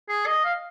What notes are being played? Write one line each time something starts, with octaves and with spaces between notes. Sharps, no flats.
G#4
D#5
F5